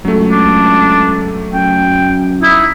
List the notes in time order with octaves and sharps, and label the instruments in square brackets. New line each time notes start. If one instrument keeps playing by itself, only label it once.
[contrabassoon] C#2 [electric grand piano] F#3 A3
[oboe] D4
[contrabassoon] F#2 [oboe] G5
[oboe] D#4 [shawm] E4